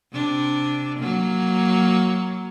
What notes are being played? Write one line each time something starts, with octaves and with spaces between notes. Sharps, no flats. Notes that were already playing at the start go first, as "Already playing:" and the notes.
C3 D4
F#3 A#3